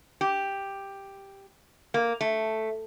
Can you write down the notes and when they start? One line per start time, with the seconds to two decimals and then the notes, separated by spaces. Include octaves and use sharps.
0.21 G4
1.94 A#3
2.21 A3